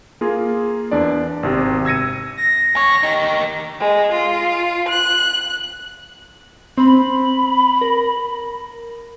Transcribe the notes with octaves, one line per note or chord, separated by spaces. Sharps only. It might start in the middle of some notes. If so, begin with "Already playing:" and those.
A#3 F4 G#4 A#4
E2 D4 D5
G#1 C3
E6 G#6 A#6 C#7 D#7
A#6
D2 C#5
D#4 G4
G#3
F4
F#6
C4 B5
A#4